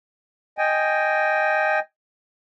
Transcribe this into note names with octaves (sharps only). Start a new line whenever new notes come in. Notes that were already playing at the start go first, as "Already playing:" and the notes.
D#5 G5 G#5